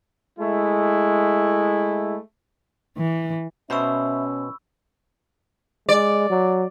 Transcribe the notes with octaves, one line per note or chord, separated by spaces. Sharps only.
G#3 A3 E4
E3
B2 C#4 C5 E5 B5 C#6 E6
G#3 D5
F#3